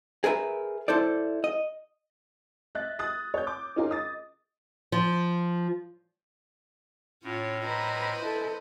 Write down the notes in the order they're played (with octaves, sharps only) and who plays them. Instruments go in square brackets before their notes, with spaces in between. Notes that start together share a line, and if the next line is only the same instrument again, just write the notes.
[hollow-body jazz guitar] G#4 A#4 B4 E5
E4 A4 C5 D5
D#5
[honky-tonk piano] D#5 E5 F#6 A6
D#6 F#6 A6
C#5 G6
D6
C#4 D#4 F4 G#4 A#4
D#5 D#6 A6
[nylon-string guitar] F3
[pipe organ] A2 [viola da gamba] C#4 F4 C#5
[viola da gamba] B4 C5 D#5 [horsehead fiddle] A#5 B5
[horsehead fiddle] E4 A4